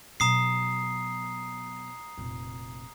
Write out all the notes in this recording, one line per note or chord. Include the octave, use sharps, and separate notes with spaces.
B2 F#3 A#5 D#6 C7
F1 A#2